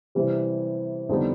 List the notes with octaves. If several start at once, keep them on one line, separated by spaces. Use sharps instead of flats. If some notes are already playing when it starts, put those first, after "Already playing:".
C3 E3 G3
F2 D3 G3 B3 D#4